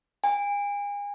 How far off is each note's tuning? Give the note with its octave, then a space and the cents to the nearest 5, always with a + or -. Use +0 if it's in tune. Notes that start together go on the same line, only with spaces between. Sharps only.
G#5 -35